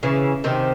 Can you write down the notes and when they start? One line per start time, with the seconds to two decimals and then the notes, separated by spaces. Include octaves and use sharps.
0.03 C#3 E3
0.44 C3 D#3